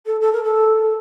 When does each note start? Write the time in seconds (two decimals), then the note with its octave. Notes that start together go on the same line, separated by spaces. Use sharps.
0.06 A4
0.20 A4
0.32 A#4
0.43 A4